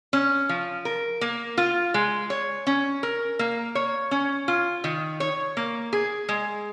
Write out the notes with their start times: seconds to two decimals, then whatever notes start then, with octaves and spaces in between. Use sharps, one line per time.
0.13 C#4
0.49 F3
0.85 A#4
1.21 A#3
1.57 F4
1.94 G#3
2.30 C#5
2.67 C#4
3.03 A#4
3.39 A#3
3.75 C#5
4.11 C#4
4.48 F4
4.84 D#3
5.20 C#5
5.57 A#3
5.93 G#4
6.29 G#3